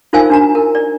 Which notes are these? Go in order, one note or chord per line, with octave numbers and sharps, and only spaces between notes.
D#4 F4 A#4 C5 F5 G#5
D4 F#4 A#5
A#4
D5